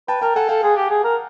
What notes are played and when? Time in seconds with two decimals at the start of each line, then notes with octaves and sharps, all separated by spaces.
0.08 B4 G5 A5
0.21 A#4 G5 A5
0.36 A4 F#5 G#5
0.49 A4 F5 G5
0.63 G#4
0.76 G4
0.90 G#4
1.04 A#4